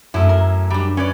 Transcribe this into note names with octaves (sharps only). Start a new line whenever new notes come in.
F#2 A3 E4
A#4
G3 D4
C#4 B4 D5